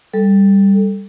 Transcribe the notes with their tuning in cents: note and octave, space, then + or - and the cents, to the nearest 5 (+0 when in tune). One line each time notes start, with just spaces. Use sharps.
G3 +10 A4 +0